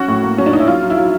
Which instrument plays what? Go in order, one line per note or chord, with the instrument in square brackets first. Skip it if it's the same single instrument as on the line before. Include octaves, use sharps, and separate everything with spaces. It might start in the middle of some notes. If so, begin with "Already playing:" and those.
Already playing: [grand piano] C#4 [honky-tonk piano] F#4
[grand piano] A2
A#3
[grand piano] F#3 [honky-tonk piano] C#4
[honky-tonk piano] D4
[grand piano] F#3 [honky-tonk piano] D#4
[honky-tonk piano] E4
[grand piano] F#3 [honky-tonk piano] F4
[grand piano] F#3
[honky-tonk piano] E4
[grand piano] F#3